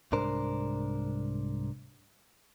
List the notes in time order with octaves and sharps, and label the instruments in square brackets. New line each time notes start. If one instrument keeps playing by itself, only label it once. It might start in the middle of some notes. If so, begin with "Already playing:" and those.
[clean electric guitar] C2 G#2 D4 A#4 C5